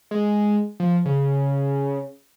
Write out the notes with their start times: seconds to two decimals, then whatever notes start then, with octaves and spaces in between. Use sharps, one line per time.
0.11 G#3
0.80 F3
1.06 C#3